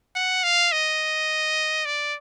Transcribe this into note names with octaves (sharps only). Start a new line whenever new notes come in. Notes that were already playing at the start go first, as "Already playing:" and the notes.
F#5
F5
D#5
D5